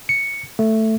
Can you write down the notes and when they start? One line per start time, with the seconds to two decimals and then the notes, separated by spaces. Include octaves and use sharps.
0.09 C#7
0.59 A3